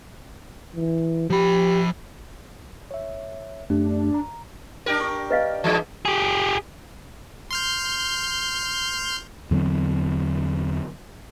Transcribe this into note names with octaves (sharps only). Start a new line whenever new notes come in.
E3
F3 G4 B5
C#5 E5
F#2 A3 D4 G4
A#5
D4 G4 A#4
C6 C#6
B4 D#5 F5
E3 G#3 D#4
G4 G#4
C6 F6 G6
E2 D3 F#3 C4